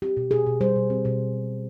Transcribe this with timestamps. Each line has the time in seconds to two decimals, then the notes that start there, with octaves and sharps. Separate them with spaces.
0.02 C4 G4
0.17 B2
0.31 B2 G#4
0.46 B2
0.61 G3 C5
0.76 B2
0.90 C4
1.05 B2